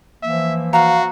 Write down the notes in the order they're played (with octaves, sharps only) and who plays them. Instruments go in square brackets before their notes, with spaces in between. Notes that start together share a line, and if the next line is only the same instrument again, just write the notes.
[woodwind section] E3 F3 A#3 [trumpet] E5
[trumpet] F#4 [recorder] F5 [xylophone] A#5